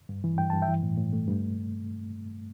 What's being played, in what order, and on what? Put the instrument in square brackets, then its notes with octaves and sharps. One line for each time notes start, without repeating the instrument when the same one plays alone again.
[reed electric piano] G2
E3
G2 G5
G2 A5
E5 G5
E3
A2
A2
A3
G2